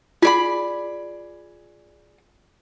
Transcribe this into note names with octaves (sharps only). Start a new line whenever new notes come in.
F4 G#4 D5 B5